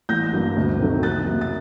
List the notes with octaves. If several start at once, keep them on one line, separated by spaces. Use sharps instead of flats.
A1 G6 A#6
G2 F#3 A#3
D2
C3 D#3 F#3 A3
F#1 F#6 A6
F#2 F#3 A#3
A6